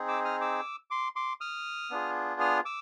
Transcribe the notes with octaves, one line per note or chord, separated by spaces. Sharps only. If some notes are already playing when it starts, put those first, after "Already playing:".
Already playing: C4 D#4 G#4
D6 E6
D#6 F6
D6 E6
C6 D6
C6 D6
D#6 F6
B3 D4 F4 G#4
D#6 F6
D6 E6